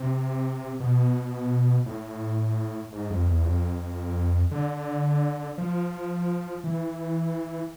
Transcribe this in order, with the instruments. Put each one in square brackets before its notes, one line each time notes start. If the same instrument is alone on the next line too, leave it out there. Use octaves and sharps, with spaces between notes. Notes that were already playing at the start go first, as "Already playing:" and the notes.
Already playing: [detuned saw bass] C3
B2
A2
G#2
F2
E2
F2
D3
F3
E3